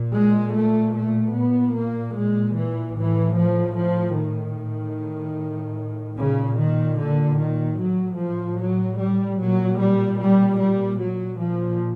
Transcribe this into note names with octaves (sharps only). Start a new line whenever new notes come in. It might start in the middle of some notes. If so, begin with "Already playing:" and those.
Already playing: A#2
G#3
A3
A3
A#2 B3
A#3
G#3
E3
A2 E3
F3
F3
D#3
A2
A#2 C#3
D#3
D3
D#3
A2 F#3
F3
F#3
G3
A#2 F#3
G3
G3
G3
A#2 F#3
F3